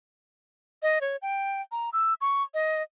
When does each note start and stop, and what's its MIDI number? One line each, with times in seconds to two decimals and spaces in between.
0.83 0.99 75
1.01 1.16 73
1.22 1.61 79
1.72 1.90 82
1.93 2.14 88
2.21 2.43 85
2.54 2.82 75